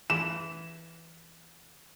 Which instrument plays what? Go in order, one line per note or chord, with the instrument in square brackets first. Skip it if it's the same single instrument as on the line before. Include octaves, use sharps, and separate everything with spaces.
[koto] E3 [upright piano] E7